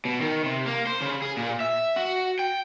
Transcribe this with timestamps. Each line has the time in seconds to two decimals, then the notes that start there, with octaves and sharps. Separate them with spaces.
0.05 B2
0.21 D#3
0.44 C3
0.65 A#3
0.86 C5
1.01 C#3
1.22 G#4
1.37 A#2
1.60 E5
1.97 F#4
2.39 G5